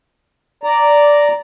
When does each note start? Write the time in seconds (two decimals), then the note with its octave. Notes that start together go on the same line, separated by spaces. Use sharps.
0.63 D5 A#5